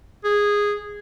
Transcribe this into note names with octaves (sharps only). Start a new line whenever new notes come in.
G#4